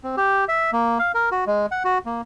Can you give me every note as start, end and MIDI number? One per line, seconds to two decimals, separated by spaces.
0.04 0.16 60
0.17 0.44 67
0.49 0.71 76
0.73 0.98 58
0.99 1.12 77
1.14 1.29 70
1.32 1.44 66
1.47 1.66 56
1.71 1.83 78
1.85 1.98 66
2.06 2.21 58